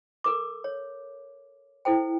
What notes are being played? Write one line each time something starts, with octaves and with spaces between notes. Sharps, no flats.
A4 A#4 D6
C#5
E4 A4 C5 G5